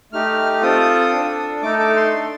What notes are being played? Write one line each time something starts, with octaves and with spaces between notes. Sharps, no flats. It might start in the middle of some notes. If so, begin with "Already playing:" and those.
A3 D#4 G4 F6
C4 F4 A4 D#6
D4 A4
A3 D#4 A4 D6
D6
C6
D4 A4